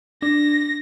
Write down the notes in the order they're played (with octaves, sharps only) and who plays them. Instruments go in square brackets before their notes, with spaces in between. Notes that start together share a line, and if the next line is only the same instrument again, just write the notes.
[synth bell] D4 [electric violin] A#6